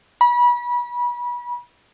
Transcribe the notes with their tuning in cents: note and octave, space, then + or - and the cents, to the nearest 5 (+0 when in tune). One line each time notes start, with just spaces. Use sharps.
B5 -30